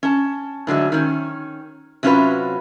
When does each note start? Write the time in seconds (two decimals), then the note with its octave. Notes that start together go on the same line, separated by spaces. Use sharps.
0.03 C#4 A5
0.67 G#2 D3 F#3 A3
0.92 D#3 C#4
2.03 C3 F#3 C#4 D4 F4 B4